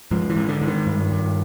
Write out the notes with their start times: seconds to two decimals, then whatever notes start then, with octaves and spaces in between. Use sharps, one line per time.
0.11 G#2 F3
0.30 E3
0.36 G#2
0.49 D3
0.61 G#2
0.68 D#3
0.87 G2
1.12 G2